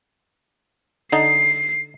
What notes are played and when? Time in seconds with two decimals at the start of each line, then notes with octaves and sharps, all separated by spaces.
1.12 D3 D#4 C7